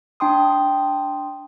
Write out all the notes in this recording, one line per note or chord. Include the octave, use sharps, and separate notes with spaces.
D4 G5 C6 D#6